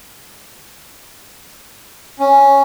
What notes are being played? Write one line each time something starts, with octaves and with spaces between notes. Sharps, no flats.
C#4